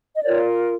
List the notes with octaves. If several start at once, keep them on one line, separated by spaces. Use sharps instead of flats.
D#5
F4 A#4 C#5 D5